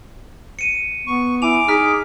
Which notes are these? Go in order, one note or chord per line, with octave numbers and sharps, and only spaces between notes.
C#7 D#7
B3 C#6
E4 G#5 D6 F7
D#4 G#4 F6 B6